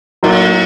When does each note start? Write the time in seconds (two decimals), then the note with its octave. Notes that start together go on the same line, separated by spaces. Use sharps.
0.23 A2 F#3 A#3 D#4